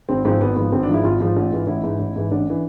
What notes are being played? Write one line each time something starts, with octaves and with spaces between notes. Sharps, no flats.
G#1 C4
G#2 F3 C4
G#1 B3
G#2 F3 B3
G#1 C4
D4
G#2 F3 E4
G#1 F4
G#2 F3
A1
G#2 E3
A1 E4
G#2 E3
A1
G#2 E3
A1 D4
E3